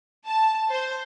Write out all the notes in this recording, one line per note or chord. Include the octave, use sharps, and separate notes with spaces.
A5
C5